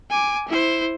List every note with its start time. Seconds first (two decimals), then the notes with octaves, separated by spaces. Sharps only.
0.10 G#5 D6
0.48 E4 C5